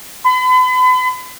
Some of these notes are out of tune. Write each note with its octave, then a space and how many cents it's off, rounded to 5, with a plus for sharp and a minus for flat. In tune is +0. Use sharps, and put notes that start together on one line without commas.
B5 +40